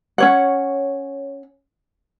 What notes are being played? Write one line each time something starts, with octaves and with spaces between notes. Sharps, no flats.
C#4 C#5 F#5